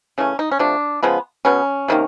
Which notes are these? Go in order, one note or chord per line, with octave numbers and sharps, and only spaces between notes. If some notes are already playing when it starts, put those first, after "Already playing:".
C#3 E3 A3 C#4
D#4
C#4
C3 F3 A3 D4
C#3 F3 G#3 B3
B2 G#3 B3 C#4
C3 D#3 F#3 A#3